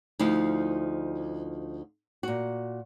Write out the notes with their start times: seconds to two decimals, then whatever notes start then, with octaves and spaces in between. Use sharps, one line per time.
0.19 D2 F3 D#4 E4 F5
2.23 A#2 F#4